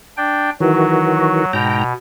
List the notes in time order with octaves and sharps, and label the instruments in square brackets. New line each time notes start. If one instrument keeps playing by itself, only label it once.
[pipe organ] D4 G5
[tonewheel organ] D#3 E3 F#4 [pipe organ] F#3
[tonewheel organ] G#2 G5 A#5 [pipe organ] B2